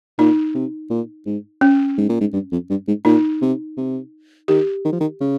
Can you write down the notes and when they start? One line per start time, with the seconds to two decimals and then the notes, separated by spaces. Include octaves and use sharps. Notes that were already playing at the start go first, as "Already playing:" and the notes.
0.18 A#2 D#4
0.54 C3
0.90 A#2
1.26 G#2
1.61 C#4
1.98 G#2
2.09 A#2
2.21 G#2
2.33 G2
2.52 F2
2.70 G2
2.88 G#2
3.05 A#2 D#4
3.42 C3
3.77 C3
4.48 D#3 G4
4.85 D#3
4.92 F3
5.00 D#3
5.21 C#3